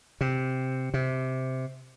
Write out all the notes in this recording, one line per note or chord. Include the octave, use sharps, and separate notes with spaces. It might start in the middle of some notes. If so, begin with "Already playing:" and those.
C3
C3